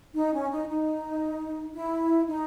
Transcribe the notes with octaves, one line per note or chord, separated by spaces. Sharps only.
D#4
C#4
D#4
D#4
E4
D#4